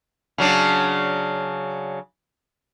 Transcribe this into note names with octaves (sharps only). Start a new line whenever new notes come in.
C#3 F#3 D4